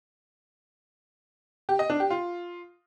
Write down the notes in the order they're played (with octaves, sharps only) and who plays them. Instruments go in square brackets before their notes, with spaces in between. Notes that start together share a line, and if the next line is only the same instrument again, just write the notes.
[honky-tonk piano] G4
D#5
D4
G4
F4